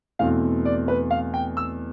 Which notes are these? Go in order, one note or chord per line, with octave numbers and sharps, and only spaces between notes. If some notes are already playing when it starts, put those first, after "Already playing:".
E2 B2 A3 C4 F5
D5
B4
F5
G5
E6